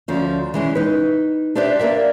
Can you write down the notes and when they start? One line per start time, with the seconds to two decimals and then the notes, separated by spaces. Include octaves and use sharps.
0.08 D2 F3 C#4
0.54 E3 G#3 C#4
0.75 D#4 B4
1.55 D4 G4 B4 C5 D5 E5
1.79 A#3 A#4 D5 E5